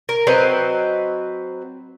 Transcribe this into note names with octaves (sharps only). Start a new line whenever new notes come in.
A#4
F#3 C4 B4 D#5